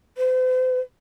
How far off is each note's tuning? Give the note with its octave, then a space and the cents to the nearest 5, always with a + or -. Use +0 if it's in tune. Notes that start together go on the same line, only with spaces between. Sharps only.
C5 -40